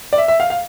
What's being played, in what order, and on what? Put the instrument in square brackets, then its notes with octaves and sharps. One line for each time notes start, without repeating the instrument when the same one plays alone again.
[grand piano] D5
E5
E5
F5
F5